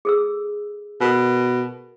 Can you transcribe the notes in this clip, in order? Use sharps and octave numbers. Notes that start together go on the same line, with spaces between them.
G#4 A4 E6
B2 A4 A#4